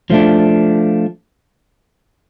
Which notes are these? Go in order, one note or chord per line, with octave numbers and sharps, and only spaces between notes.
F3 A3 D4